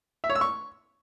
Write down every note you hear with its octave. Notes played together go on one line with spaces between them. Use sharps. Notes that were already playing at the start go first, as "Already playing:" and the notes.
E5
C#5
E6
C#6